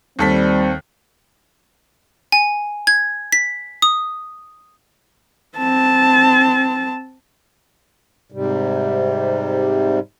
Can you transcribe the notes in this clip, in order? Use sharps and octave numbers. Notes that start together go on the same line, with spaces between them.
D#2 G3 C4 A4 B6
G#5
G#6
B6
D#6
C4 A5
G#2 C3 G3